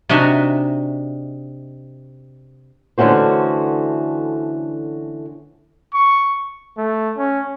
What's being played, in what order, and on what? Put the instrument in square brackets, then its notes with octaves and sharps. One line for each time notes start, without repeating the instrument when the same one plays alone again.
[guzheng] C3 D4 D#4 F#4 E5 G#5
[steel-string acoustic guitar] D3 E3 A3 C#4 F#4 C5
[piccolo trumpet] C#6
[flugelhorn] A3
C#4